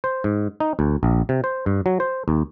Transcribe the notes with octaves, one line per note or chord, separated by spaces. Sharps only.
C5
G#2
D#4
D2
A#1
C3
C5
G2
F#3
C5
D#2